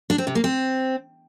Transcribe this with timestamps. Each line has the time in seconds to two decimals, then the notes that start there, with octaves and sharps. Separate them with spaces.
0.10 D4
0.18 C4
0.27 C3
0.35 A#3
0.44 C4